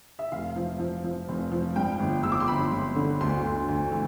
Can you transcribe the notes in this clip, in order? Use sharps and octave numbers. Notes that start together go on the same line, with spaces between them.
E5
F1 F5
F3
F3
F3
F1
F3
G2 G5
G1
G1 E6
D6
C6
G1 B5
G1
D3
D2 C6
D2
D2
E3